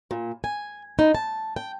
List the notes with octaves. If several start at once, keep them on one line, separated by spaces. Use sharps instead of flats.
A#2
G#5
D#4
A5
G5